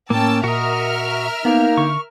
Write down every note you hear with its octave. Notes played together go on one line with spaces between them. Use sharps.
A2 A#3 C#4 G5 A5 E6
A#2 F#4 A#4 D#5 E5 F6
A#3 B3 D#4
D3 C#6